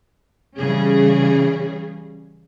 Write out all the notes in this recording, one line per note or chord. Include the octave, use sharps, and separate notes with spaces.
C#3 E3 G3 C#4 G#4